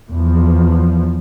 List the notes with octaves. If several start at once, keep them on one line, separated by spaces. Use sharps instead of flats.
E2 F3